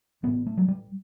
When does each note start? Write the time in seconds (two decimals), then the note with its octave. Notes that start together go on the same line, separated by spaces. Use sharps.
0.23 A1 A2 B3
0.46 A3
0.57 F#3
0.68 G3